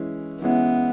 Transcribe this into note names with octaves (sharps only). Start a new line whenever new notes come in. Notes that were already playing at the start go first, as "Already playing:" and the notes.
Already playing: E3 G#3 C#4 E4
E3 G#3 B3 C#4 E4